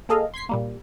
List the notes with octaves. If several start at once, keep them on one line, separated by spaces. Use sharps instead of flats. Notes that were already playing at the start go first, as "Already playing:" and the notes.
A#3 G#4 A4 D#5 F5
C6 G#6 B6 C7
A#2 G3 A#3